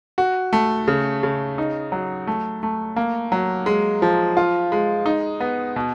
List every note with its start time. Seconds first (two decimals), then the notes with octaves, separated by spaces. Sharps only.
0.18 F#4
0.53 A3
0.88 C#3
1.23 C#3
1.58 D#4
1.92 F#3
2.27 A3
2.63 A3
2.96 A#3
3.32 F#3
3.66 G#3
4.02 F3
4.37 F4
4.72 G#3
5.06 D#4
5.40 B3
5.76 B2